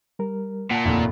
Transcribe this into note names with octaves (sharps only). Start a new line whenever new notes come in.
G3 A#4
A#2 F#5 A5
F1 D#2 A2